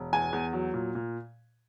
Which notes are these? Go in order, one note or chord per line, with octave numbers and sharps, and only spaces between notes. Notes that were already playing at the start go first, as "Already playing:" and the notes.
Already playing: E1
E2 G#5
E2
F#3
A#2
A#2